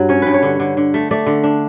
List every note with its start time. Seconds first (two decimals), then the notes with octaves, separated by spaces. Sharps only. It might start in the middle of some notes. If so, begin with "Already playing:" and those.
Already playing: G2 F#3
0.09 C#4 C#5
0.22 G2 B4
0.34 C#5
0.43 D3
0.60 D3
0.77 D3
0.94 A3
1.11 A3 D5
1.27 D3
1.44 D4